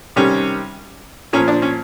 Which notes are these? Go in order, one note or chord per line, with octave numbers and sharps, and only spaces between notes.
C3 D#3 G3 C#4
A#2 F3 C#4
D4
C#4